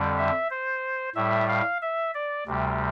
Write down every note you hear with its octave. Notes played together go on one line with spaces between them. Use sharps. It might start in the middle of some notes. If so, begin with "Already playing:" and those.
Already playing: F2 D3 G3
E5
C5
A2 G3 E5
F5
E5
D5
D2 C3 G3